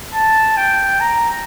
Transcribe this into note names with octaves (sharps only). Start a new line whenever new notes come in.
A5
G5
A#5